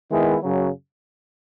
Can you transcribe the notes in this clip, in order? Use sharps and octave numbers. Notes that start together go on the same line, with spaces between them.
D#3 G#3 B3 E4
F#2 C#3 F#3